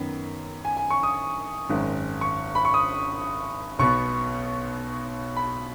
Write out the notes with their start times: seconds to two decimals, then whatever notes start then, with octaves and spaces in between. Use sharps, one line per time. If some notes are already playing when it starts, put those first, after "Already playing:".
Already playing: F#2 D#3 B3
0.65 G#5
0.77 G#5
0.90 C#6
1.03 D#6
1.69 G#1 F#2 D#3 G#3
2.21 C#6
2.55 B5
2.65 C#6
2.74 D#6
3.79 B1 B2 B3 C#6
5.37 B5